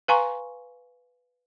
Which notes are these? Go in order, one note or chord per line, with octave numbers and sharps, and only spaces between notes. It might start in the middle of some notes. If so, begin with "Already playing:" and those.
B4 F5 G#5 A#5 C6 C#6